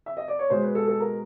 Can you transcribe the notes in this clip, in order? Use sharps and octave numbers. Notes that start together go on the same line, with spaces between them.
E5
D#5
D5
C#5
B2 G#3 C5
B4
A4
A4
A#4